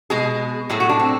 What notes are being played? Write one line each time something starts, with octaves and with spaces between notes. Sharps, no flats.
B2 G#3 G#4
A2 F#3 A3 G#4
F#4
D4
C4